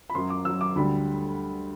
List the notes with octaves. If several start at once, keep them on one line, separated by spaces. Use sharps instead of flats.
B5
F#2 F#3 C6
D6
F#2 F#3 E6
D6
D2 D3 G3 B5